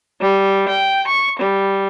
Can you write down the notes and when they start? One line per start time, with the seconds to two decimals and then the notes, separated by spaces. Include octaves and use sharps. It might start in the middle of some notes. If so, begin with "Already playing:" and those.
0.21 G3
0.68 G5
1.07 C#6
1.38 G3